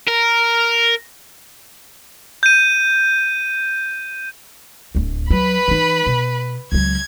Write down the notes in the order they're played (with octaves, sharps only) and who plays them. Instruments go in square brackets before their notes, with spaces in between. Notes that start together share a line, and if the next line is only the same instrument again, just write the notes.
[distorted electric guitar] A#4
[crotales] G6 D#7
[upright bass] D1 D2
[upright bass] F#3 [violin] B4 B5
[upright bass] E3 D#4
B2
[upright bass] C#2 F#3 [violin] G#6